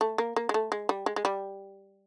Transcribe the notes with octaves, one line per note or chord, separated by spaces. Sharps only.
A3
A#3
A#3
G#3
A3
G#3
G3
G#3
G#3
G3